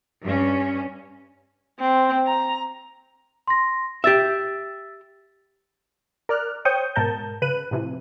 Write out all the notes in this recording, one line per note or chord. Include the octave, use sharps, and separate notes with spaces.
G2 C#4
C4
A#5
C6 A#6
G4 E5 E6 A6 B6
A#4 D5 F6 F#6
C5 C#5 G5 C#6 D#6 G6
G#2 B2 A#4 A5 G6
C#3 B4 F#6 D#7
A2 C3 E3 F3